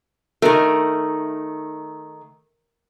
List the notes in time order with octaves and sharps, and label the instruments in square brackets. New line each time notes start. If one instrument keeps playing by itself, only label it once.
[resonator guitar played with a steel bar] D#3 A3 [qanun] A#4